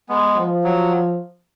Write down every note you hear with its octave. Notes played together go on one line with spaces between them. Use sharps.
G#3 B3
F3
F#3